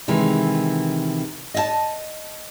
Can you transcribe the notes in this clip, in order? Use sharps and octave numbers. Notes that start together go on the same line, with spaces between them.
C3 D#3 E3 G#3
D#5 E5 A5